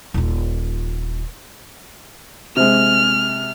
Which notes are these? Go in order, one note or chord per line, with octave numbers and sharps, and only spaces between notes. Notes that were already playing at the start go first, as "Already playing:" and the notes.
D#1 F4
C3 G#3 F6